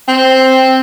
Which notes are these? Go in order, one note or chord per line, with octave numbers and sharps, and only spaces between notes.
C4